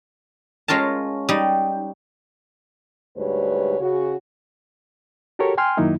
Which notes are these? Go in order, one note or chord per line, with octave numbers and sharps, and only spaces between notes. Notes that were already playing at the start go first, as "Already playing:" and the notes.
G#3 C#4 F4 A#4 A5
G3 D#4
D2 G#2 G3 B4 C#5
C#3 F#4
F#4 G4 A4 A#4 C#5
G5 G#5 C6 F6
F#2 D#3 F#3 A#3 D#4 E4